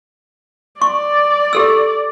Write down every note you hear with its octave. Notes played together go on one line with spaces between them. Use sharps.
D5 C#6
G4 A4 E6